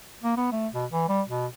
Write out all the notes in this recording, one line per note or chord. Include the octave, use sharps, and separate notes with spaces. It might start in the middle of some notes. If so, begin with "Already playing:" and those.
A#3
B3
A3
B2
E3
G3
B2